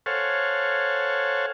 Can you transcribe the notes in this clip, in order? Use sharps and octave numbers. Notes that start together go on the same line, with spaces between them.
A4 C5 C#5 F5 F#5 G#5